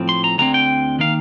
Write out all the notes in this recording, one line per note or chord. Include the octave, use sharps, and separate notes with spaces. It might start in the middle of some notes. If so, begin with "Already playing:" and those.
Already playing: A2 F3 C4
C6
A#5
D2 D3 F3 C4 A#5
G5
D#3 A#3 F5